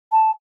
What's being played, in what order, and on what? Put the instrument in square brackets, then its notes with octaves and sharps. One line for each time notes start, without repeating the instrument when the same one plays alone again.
[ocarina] A5